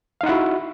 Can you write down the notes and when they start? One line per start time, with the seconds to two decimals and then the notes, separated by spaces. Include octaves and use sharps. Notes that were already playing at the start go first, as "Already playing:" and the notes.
0.21 F5
0.23 D#4
0.26 F#5
0.29 E4
0.32 F#4